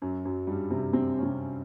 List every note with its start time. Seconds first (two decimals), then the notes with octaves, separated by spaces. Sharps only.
0.02 F#2 F#3
0.25 F#2 F#3
0.47 G2 G3
0.70 C3 C4
0.93 C3 C4
1.18 C#4
1.23 C3 C4